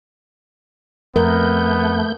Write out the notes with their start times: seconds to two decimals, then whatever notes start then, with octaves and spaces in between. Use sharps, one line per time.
1.16 F2 A3 B3 A#4 G6